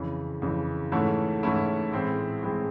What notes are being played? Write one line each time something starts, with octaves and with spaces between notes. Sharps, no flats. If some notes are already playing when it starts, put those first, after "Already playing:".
Already playing: F2 C#3 E3
F2 C#3 E3
G#2 E3 A3 C#4 E4
G#2 E3 A3 C#4 E4
A2 E3 G#3 C4 E4
A2 E3 G#3 C4 E4